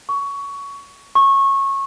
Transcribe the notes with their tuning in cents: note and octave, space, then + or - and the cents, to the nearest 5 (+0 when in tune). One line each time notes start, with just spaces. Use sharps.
C#6 +15
C#6 -20